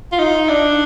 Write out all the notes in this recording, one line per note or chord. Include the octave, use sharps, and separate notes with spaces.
F4
D#4
D4